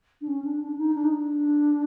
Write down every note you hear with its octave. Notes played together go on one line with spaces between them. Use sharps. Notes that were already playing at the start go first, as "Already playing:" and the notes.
D4
C#4
D4
D4
D4
D#4
D4
D#4
D4